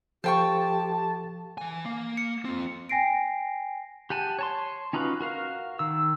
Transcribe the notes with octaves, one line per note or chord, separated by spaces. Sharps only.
F3 G4 A4 C5 F5 G5 A5 C#6
E3 G#5
A#3
C#7
C4 F4
G5 G#5 A#6 C7 D7
G4 F#5 G#5 A5
C#5 A5 C6
C#4 D#4 F4 F#4 B4
F#4 A#4 F5
D#3 E6